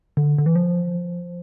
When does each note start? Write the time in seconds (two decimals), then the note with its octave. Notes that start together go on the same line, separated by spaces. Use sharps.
0.17 D3
0.38 D3
0.46 E3
0.55 F3